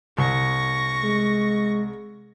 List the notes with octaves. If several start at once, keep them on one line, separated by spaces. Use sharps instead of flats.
C2 C#6 A#6
G#3